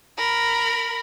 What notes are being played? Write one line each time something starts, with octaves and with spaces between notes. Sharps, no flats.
A#4 B5